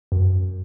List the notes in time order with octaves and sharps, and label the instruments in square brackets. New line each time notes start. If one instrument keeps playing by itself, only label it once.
[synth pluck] F#2